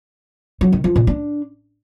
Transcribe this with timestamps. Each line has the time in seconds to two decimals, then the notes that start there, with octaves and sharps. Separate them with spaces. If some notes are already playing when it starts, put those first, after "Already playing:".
0.61 F#3
0.73 D#3
0.84 F3
0.96 A#2
1.07 D4